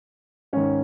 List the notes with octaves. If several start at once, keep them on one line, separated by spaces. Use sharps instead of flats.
G#2 D#3 C#4